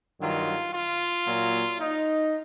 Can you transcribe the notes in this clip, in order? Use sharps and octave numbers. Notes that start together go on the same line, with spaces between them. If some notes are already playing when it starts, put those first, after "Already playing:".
G2 D#3 F#3 F4
F4
A#2 F#3
D#4